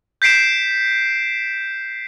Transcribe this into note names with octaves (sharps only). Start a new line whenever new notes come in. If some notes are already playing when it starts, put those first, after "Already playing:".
G6 B6 C7 D7 E7